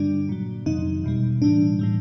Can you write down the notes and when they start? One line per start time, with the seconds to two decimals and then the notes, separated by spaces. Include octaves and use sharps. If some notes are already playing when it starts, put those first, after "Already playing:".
Already playing: G2 D3 G3 D4
0.29 A#2 F#3
0.66 F2 C3 D#3 F#3 D#4
1.04 E2 B2 G3
1.42 A2 E3 G3 D4
1.79 A2 E3 G3